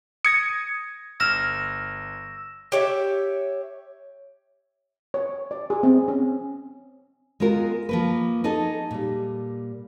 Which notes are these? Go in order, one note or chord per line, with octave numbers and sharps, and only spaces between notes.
D#6 G#6 A#6 C#7
G1 E6 F6 A#6 E7
G4 C#5 E5
C#5
D5
G#4
C4
C#4
G#3 B3 F4 A#4
F3 A#3 B4
D#4 G#4 A4 D#5
A#2 G3